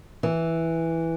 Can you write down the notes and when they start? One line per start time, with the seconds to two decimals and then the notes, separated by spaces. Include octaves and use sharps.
0.23 E3